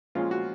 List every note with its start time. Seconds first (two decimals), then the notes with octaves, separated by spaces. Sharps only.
0.15 A#2 F3 G#3 C#4 F4
0.31 F#4